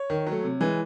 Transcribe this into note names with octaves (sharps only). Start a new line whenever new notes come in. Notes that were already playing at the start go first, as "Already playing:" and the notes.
Already playing: C#5
D#3
F#3
A3
C3
E3 G#3